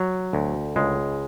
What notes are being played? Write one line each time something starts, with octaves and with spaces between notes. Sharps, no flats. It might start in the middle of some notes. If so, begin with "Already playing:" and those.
Already playing: F#3
D2
C#2 G#3